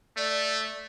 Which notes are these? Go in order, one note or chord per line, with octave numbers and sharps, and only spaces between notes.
A3 D5